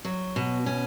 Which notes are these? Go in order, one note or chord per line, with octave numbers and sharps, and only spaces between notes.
F#3
B2
C#4